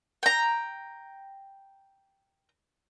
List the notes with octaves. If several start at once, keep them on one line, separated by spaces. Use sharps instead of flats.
G5 A#5